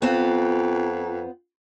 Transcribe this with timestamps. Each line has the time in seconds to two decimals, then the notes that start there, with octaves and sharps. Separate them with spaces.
0.02 F2 B3 C4 F4